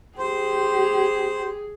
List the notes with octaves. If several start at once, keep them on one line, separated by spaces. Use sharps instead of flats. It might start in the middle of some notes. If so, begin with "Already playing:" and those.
G4 G#4 C5